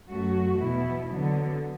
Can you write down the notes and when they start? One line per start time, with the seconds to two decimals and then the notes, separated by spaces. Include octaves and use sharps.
0.09 F#2 F#3 A3 F#4
0.59 E2 B2 B3 E4
1.08 D3 F#3 B3